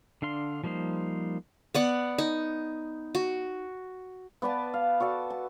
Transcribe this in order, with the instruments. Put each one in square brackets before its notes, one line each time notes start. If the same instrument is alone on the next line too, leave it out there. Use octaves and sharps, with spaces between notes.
[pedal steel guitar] D3 D4 F5 C6
F3 G3 A#3 D#4 C5
[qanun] B3 D5 F#5
D#4
F#4
[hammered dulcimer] B3 B4 D5 A5
F5
F#4 A4 D5
A5